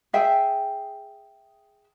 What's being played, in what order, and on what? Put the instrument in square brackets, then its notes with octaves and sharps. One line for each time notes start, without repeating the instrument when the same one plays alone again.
[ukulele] G#4 E5 G5